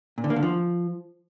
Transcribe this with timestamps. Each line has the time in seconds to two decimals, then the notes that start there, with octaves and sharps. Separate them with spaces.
0.18 A#2
0.24 D3
0.30 A#3
0.36 D3
0.43 F3